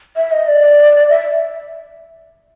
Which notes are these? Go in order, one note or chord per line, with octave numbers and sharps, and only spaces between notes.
E5
D#5
D5
E5